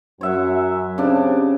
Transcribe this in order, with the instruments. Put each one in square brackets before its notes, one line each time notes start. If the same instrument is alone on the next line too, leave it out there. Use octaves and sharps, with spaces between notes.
[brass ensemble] F#2 [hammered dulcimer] C#5 E5 F#5
[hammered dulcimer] C#3 D4 [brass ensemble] C4 G4 C#5